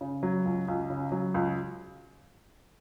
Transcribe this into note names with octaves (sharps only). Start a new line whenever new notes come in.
C#3
F#3
C#2
C#2
C#3
F#3
C#2